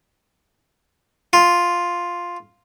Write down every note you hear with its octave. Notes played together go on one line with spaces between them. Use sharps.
F4